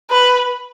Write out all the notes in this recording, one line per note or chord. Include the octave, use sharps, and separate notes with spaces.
B4